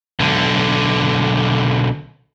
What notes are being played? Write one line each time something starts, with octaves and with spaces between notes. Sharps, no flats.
B1 D3